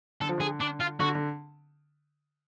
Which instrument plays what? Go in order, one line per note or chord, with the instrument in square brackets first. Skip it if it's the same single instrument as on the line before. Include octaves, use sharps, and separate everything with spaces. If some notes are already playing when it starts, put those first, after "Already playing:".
[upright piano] D3 [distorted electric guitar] A4
[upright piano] F3
[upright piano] D3 [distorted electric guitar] G#4
[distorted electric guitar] D4
F4
[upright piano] D3 [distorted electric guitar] F#4
[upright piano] D3